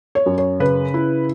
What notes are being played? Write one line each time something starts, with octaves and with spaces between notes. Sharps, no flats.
C#5
F#2
C#5
C#3 B4
E4